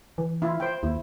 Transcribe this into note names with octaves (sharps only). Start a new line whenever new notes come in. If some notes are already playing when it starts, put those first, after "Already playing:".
E3
E4 F4
C5 G5
D#2 E4